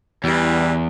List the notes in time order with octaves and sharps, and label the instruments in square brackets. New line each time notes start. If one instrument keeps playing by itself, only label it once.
[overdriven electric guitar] E2 [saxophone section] E3 G3